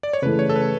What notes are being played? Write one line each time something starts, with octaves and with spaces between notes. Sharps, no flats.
D5
C#5
C#3 E3 A3 B4
C#5
A4
B4